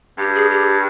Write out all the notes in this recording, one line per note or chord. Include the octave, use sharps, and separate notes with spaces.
G2 G4
G#4
G4